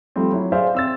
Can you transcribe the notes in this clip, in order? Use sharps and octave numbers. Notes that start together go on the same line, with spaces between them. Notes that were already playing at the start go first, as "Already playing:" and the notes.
F3 G3 A3 C4
F#3 E4
G#4 C5 D5 E5 F5
C4 E6 A6